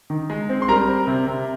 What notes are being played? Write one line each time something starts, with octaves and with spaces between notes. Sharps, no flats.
D#3
G#3
C4
C6
G3 A#4 A#5
C4
C3
C3